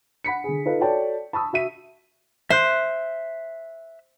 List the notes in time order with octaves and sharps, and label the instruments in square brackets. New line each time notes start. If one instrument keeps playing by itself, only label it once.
[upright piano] F#5 B5 B6 C#7
D3 G#4
D#4 F4 A4 B4 F5
F#4 A4 C#5 D5 G5 A5
A5 B5 C#6 D#6 E6
F#4 E5 B6 D#7
[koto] C5 [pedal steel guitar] E5 F#6